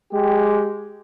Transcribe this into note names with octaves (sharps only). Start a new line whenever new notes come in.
G#3 G4